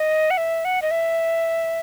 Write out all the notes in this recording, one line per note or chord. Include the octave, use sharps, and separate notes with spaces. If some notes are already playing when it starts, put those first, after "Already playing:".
Already playing: D#5
F#5
E5
F#5
D#5
E5